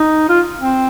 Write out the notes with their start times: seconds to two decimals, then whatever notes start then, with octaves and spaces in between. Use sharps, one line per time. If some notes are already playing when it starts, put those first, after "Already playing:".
Already playing: D#4
0.29 F4
0.60 C4